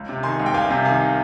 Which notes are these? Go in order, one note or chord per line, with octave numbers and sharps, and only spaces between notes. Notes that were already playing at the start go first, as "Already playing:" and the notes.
Already playing: C#2
C3
D#3 G#5 C6
C#2
G5
C2 F5 G#5
C3
D#3 F5 G#5